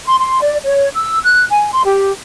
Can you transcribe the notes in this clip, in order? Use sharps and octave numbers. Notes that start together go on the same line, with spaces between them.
C6
C6
D5
C#5
E6
F#6
G#5
C6
G4